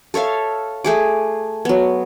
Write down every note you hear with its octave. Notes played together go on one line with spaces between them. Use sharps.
A4 C#5 E5 F5
A3 G#4 D6
F#3 B3